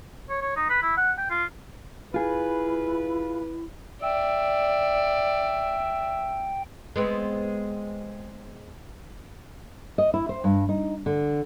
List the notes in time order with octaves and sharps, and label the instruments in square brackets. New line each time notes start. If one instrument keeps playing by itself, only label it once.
[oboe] C#5
C#5
D#4
B4
E4
F#5
G5
F4
[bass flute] E4 [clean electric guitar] F4 G#4 [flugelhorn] B4
[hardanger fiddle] D5 [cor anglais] E5 [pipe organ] G5
[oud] G#3 B3 C4
[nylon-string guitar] D#5
E4
C5
G2
D#4
D3